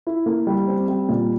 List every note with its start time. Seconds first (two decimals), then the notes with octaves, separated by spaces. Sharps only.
0.07 E4
0.26 A#3
0.47 G3
0.68 C4
0.88 G3
1.09 A#2